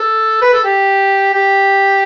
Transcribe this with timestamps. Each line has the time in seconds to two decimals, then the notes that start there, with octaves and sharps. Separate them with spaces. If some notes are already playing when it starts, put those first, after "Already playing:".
Already playing: A4
0.42 B4
0.53 A4
0.64 G4
1.34 G4